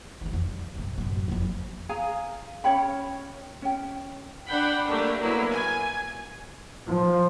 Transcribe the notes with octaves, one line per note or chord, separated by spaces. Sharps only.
E3 G3
F2
G3
G2 C3
A1 F#2
F#1 F2
G#4 F5 G#5 A#5
C#4 C#5 G5 B5
C#4 G5
D4 F#5 G5 B5
G3 A3 A#3 D4
F#3 A#3 B3 E4
G#5
F3